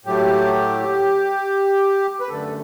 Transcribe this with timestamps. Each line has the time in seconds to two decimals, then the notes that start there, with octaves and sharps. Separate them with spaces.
0.05 A2 F#3 A3 G4
2.21 B4
2.29 F#2 D3 A3 A4